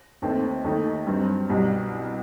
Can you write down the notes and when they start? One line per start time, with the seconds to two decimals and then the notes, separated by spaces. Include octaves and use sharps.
0.22 D#2 D#3 A3 C4
0.64 D#2 D#3 A3 D#4
1.07 G2 F#3 C4
1.50 C2 B2 G3